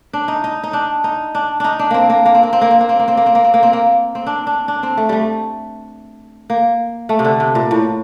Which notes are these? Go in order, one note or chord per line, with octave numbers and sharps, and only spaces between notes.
D4
D#4
D#4
D#4
D4
D#4
D4
D4 D#4
D4
A#3 C4
A#3
A#3
C4
A#3
C4
A#3
C4
A#3
C4
A#3
C4
A#3
C4
A#3
C4
A#3
C4
A#3
C4
D4
D4
D4
C4
A3
G3 A3
A#3
A3
C3
D3
C3
A#2
A2